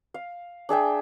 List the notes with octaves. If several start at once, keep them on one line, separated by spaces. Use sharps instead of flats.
F5
D4 G#4 E5 G5